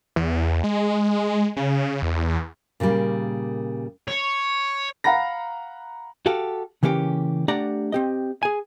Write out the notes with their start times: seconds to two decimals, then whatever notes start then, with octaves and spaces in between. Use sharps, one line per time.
0.16 E2
0.64 G#3
1.57 C#3
2.02 E2
2.80 A#2 C#3 E3 G3 A#3
4.08 C#5
5.04 F5 F#5 A#5 B5 A#6
6.26 F#4 G4 A4 F5
6.83 C#3 E3 A#3 C#4 G4
7.48 A3 D4 G4 D5 F#5 A#5
7.92 C4 G4 D#5
8.43 G#4 G#5